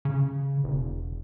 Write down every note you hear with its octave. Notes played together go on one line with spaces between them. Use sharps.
C#3
E1